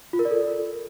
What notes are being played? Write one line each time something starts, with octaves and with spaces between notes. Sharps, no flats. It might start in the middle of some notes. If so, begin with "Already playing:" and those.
F4
A#4
D5
A4